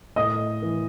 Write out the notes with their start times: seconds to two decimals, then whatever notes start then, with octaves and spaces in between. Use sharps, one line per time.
0.16 A2 D#5 D#6
0.62 E3